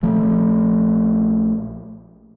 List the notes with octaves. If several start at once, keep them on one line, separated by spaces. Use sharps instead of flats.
A#1 F3 A3